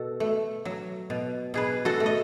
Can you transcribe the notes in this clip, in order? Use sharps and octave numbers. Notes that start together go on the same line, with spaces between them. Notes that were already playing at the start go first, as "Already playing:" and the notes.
Already playing: B2 F#4 A4
A3
F#3
B2
B2 G#4 B4
F#4 A4
A3
D#5